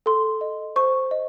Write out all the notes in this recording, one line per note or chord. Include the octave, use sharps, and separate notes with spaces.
A4 C6
D#5
C5 C#6
D#5